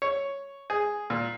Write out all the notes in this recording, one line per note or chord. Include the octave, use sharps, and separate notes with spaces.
C#5
G#4
A#2